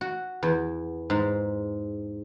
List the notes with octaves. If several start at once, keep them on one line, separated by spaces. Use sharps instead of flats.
F#4
E2
G#2